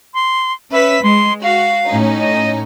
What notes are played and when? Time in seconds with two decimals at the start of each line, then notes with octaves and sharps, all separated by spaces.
0.14 C6
0.72 C#4 B4 E5 B6
1.03 G#3 C6
1.43 F#4 F5
1.87 A2 C#4 D#4
2.19 D#5